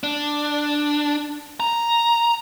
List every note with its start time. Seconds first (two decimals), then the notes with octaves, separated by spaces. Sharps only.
0.03 D4
1.60 A#5